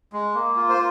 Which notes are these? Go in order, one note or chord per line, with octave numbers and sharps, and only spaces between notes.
G#3
A#3
F4
C5